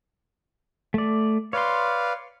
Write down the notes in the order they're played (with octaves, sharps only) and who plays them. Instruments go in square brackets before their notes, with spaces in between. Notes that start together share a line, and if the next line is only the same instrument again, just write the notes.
[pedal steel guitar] A3 D5
[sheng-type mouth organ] B4 D5 F5 [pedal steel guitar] C#5 C6